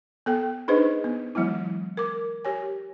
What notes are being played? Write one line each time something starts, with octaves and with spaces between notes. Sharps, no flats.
B3 A4 G5
D4 D#4 G#4 B4 C5 D#5
B3
E3 F#3 G#3 B3 E4
A#4 D6
G4 C#5 G#5